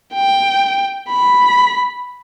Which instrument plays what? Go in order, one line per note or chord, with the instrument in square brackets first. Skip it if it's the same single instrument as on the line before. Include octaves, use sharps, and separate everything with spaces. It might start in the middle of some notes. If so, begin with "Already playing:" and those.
[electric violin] G5
B5